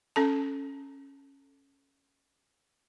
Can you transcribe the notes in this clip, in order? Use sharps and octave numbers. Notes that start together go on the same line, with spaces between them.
C#4 A4 A5